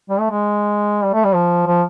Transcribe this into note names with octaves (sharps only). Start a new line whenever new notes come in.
G3
A3
G#3
G3
A3
G3
F3
F3